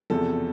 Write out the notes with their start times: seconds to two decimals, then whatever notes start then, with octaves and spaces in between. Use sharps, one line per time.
0.10 E1 E2 C3 F3 A4